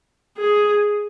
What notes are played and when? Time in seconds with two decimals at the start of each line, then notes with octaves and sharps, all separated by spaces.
0.37 G#4